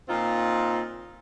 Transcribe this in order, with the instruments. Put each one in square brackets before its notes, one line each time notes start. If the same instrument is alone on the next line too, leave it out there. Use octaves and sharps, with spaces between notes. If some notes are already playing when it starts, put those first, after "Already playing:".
[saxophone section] A#2 C4 D#4 F4